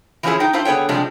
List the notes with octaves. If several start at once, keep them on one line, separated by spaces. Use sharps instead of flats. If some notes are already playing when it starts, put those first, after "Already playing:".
E3 F3 C#4 D#4 E4 G#4
D#4 G5
D4 E4 F4 C5
D3 B3 G#4 C#5 G5
C3 F3 G3 G#3 D4